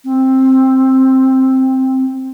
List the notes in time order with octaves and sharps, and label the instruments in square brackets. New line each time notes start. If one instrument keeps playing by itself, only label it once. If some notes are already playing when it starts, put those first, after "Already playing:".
[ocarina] C4